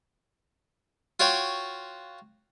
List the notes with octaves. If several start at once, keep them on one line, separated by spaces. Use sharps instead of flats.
F4 F#4 C#5 G5